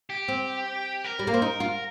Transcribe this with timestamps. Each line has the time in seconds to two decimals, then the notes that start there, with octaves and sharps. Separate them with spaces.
0.10 G4
0.28 C4
1.04 A#4
1.19 G3
1.27 A#3
1.34 C4
1.42 D#4
1.60 F4